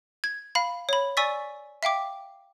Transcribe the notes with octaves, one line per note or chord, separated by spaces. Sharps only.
G#6
F5 B5
C#5 B5
D5 G#5 C#6 E6 A6 B6
E5 F5 G5 D6